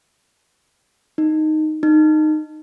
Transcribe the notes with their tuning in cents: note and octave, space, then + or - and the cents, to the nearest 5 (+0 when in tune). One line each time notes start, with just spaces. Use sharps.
D#4 +0
D#4 -15